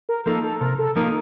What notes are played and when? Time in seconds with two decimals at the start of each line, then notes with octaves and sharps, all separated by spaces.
0.09 A#4
0.26 F3 A#3 D#4 A4
0.44 A4
0.61 C3 A#4
0.79 A4
0.96 F3 A#3 D#4 A#4